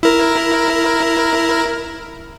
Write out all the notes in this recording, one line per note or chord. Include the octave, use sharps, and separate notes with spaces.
E4 A#4